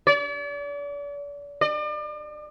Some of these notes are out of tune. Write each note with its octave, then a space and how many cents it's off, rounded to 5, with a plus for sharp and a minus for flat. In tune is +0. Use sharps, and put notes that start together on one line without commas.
D5 -40
D5 +40